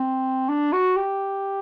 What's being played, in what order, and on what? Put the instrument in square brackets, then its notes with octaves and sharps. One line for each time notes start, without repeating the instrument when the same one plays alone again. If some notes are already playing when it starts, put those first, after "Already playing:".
Already playing: [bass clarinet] C4
D4
F#4
G4